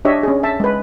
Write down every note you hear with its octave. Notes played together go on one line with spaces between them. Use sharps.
D4 G4 C#5 D#5 E5
C#4 G#4
E5 A5
G#3 B4